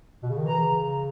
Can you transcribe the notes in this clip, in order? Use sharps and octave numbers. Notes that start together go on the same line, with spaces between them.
B2
C#3
D#3
E3 A#5
C#3